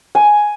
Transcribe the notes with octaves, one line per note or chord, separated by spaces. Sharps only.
G#5